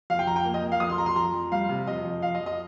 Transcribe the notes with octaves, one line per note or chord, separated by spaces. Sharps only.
F2 F5
G5
F2 A#5
G5
A#3
D#5
F2
F5
F2 D#6
C6
F2 A#5
C6
F2 A#5
F2
G3 F5
C3
F2 D#5
F2
F2 F5
D#5
F2
D#5